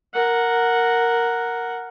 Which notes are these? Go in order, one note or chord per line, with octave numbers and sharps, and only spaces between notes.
A#4 F#5